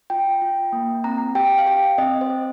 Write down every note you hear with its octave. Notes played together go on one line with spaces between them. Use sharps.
F4 G5
F4
A#3
C4 A#5
G4 G5
F5
G4 G5
C4 D#5
C5
C4